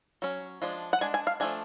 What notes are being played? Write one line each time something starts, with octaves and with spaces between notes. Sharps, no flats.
F#3 C#4
F3 G#3 D4
F#5
G#3 D4 G#5
G#5
F5
F3 A3 D4 G#5